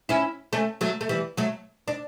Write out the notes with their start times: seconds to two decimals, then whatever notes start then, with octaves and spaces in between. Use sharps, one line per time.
0.09 C#4 E4
0.53 A3 C#4
0.81 F#3 A3
1.01 A3
1.09 E3 G3
1.37 F#3 A3
1.88 D4